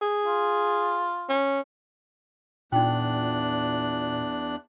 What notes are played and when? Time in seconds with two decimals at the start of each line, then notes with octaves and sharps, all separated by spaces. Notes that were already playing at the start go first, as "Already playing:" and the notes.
0.02 G#4
0.24 F4
1.29 C#4
2.72 E2 A#2 D4 D#4 G5 F#6